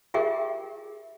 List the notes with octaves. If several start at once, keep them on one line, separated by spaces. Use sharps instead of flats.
F4 G4 G#4 A#4 E5 G5